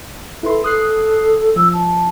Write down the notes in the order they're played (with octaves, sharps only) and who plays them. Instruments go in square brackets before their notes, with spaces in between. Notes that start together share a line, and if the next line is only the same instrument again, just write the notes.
[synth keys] E4 B4 C6 [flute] A4
[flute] A4 [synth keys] D#6 F#6 C7
[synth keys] F3 [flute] E6
[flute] A5